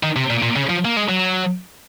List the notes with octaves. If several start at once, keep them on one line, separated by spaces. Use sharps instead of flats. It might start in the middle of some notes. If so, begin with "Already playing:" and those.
D#3
C3
A#2
A#2
C#3
F3
A#3
G#3
F#3